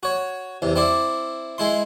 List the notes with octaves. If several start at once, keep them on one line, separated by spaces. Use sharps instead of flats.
F#4 C#5
E2 C3
C4 E4 D5
G#3 E4 C6